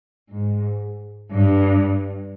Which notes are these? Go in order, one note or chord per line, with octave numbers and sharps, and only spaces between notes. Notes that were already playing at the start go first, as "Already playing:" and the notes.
G#2
G2